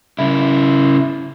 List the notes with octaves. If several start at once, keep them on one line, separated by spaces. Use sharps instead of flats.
C#3 E4